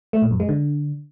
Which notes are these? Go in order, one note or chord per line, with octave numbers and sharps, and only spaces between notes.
A3
A#2
F#2
G#3
D3